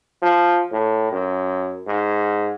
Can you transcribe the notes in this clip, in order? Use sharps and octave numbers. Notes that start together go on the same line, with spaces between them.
F3
A2
F#2
G#2